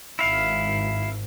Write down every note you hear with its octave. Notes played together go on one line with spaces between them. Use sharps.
G#1 E4 F5